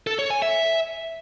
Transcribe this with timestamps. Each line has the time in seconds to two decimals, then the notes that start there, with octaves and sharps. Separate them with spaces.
0.07 A4
0.19 C#5
0.30 G#5
0.42 E5